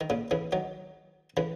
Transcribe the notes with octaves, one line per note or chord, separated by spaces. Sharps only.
D#3
A#2 C#3
C#3 E3
D#3 F#3
C#3 E3